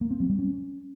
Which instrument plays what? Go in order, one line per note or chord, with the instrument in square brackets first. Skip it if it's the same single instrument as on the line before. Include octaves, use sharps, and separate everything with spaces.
[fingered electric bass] A#3
C4
F#3
G3
C#4